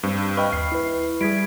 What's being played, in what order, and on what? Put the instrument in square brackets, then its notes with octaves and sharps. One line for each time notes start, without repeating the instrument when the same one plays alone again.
[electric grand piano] G2 C4
[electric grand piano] B4 D#5 G5 [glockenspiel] B5 C#6 F6
[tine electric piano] D#2 [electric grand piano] C7
[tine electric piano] E4 B4
[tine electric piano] G3 [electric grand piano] E4 G#4 [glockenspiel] G#6 B6 D7